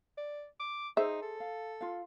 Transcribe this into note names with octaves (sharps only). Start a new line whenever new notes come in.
D5
D6
D#4 G#4 C5 E5
A4
F5
F4 F5